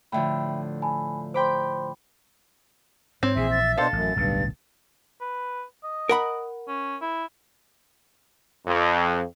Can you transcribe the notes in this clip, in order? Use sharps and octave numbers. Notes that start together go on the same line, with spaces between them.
A2 D3 F3 E5 G5 B5
G#5 A5 B5
C5 G5 B5 C6 D6
G#2 C4 C#5
A#1 E3 G#4 E5
A6
B2 D4 A4 C5 F5 A6
A1 F#2
D1 B1 G2 B2
B4
D#5
A#4 F#5 B5
C#4
E4
F2